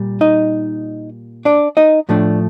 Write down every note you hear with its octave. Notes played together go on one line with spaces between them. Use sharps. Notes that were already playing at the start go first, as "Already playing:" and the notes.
Already playing: A#2 G3
D#4 D#5
D4 D5
D#4 D#5
A2 F3 A3 D4